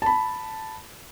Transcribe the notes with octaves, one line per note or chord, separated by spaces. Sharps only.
A5 B5